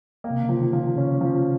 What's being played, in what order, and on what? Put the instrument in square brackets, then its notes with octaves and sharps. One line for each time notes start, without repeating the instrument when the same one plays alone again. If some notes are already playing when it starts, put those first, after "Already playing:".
[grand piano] A#3
[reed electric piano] C3
C#3
[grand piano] F3
[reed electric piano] D#3
[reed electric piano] D#3 [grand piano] F3
[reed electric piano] C#3 [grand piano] C#4
[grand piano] F3